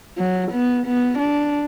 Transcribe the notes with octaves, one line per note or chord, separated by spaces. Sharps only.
F#3
B3
B3
D4